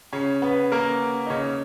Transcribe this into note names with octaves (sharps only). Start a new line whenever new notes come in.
C#3 C#4
B3 B4
A#3 A#4
D#4
C#3 C#4